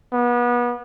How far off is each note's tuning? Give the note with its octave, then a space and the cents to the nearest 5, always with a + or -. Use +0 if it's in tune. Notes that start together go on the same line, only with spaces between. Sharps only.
B3 -30